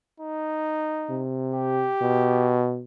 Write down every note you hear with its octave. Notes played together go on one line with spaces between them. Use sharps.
D#4
C3
G4
B2